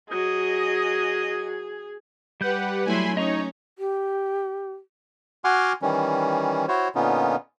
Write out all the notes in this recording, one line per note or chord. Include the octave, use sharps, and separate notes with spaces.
F#3 G#4 D#5
G3 G4 B4 F#5 G6
F#3 A3 E4 G#5 B5 C6
C#4 D#4 C#5 D#5 A#5 C#6
G4
F#4 F#5 G#5 C6 D6 F6
D#3 E3 G3 C#4
E4 F#4 C5 C#5
A#2 D3 B3 C#4 D#4 F4